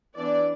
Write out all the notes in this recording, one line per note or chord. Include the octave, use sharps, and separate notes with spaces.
E3 B3 D4 D5